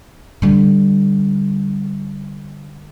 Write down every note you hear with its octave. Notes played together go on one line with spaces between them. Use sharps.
D3 G3